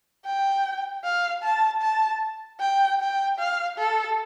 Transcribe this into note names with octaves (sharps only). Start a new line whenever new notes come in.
G5
F5
A5
A5
G5
G5
F5
A4